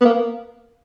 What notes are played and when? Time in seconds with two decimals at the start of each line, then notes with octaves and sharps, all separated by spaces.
0.01 B3
0.05 A#3